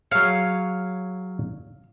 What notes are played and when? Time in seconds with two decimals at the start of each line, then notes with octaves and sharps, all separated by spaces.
0.11 F#3 G#4 C#5 F5